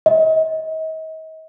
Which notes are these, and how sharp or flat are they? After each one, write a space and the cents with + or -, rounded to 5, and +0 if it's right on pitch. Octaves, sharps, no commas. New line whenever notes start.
D#5 +40